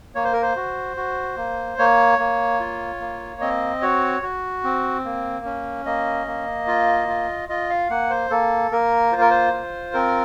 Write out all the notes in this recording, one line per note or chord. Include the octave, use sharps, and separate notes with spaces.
A#3 C#5
C5
A#4
C5
F#4
F#4
A#3
A#3 C#5
A#3
F4
A#3
C4 D#5
F#4 C#5
F#4
C4
A#3
C#4
A#3 D#5
A#3
F4
F4
F4 D#5
F5
A#3 F#5
C5
A#3 A4
A#3 A#4
F4 C5
A#4
C5
F4
C4 A#4